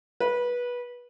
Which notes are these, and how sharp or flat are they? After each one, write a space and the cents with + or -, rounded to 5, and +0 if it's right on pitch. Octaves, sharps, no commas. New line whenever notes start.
B4 -20